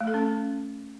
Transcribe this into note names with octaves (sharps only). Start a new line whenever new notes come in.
A3
A4
C#4